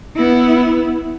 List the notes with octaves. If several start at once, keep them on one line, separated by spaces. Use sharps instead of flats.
B3 E4